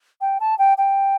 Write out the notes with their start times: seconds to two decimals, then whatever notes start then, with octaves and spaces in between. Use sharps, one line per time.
0.21 G5
0.40 A5
0.59 G5
0.78 G5